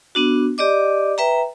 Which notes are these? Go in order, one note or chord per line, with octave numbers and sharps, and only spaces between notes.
B3 D4 F#4
G4 D5 D#5 D6
B4 E5 G5 A#5